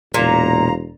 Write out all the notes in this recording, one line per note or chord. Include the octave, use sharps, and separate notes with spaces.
E1 A#2 F5 A#5